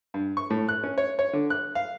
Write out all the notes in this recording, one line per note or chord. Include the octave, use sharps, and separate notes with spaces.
G2
C#6
A2
F#6
C#4
C#5
C#5
D3
F#6
F5